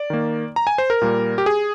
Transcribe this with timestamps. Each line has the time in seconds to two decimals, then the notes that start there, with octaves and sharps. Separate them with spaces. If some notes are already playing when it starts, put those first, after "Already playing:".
Already playing: D5
0.10 D#3 A#3
0.56 A#5
0.67 G#5
0.78 C5
0.90 A#4
1.01 A#2 G3 A#3
1.38 G4
1.46 G#4